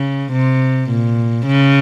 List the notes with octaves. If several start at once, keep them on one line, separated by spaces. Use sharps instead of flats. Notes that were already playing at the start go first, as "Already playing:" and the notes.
Already playing: C#3
C3
A#2
C#3